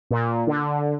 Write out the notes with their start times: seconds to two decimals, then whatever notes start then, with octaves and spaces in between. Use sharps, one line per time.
0.11 A#2
0.47 D3